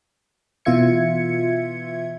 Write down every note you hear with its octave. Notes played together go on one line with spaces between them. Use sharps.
B2 E3 F4 E5 G#6 C#7